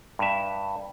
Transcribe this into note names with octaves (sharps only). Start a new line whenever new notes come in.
G2 E5